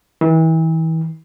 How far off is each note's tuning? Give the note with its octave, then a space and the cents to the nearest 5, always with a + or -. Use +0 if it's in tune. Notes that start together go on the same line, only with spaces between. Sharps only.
E3 -35